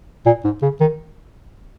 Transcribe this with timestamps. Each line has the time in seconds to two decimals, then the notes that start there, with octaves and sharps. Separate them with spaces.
0.26 A#2
0.44 G#2
0.62 C#3
0.81 D#3